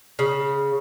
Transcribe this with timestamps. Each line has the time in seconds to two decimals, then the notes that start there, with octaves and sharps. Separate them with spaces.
0.19 C#3